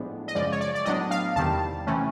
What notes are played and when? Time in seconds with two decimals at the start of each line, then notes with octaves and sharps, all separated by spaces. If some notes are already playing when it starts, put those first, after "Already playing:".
Already playing: A2 F3 G#3 B3 D4
0.28 D#5
0.35 F#2 C#3 F3 G#3 D5
0.52 C#5
0.61 D5
0.75 D5
0.85 A2 F#3 B3 D4 D#5
1.11 F5
1.36 E2 C3 D#3 G3 A5
1.87 C3 E3 A3 C#4